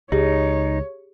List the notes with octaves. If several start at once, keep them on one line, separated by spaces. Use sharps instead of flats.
C#2 D#4 G4 G#4 C#5